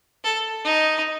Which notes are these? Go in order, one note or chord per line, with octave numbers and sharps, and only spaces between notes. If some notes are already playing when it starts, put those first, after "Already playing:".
A4
D#4